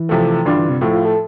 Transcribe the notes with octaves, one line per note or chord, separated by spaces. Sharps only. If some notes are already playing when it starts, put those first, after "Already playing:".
Already playing: E3
C3 F3 A3
G2 D3 E3 G3 D4 F4
E3
C3
A2 F3 A3
F4
A4